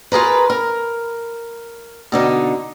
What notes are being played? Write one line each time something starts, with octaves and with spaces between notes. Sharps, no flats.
F4 G#4 A#4 B4
A#4
B2 D3 D#4